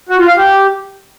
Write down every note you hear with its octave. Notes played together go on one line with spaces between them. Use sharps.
F#4
F4
F5
G4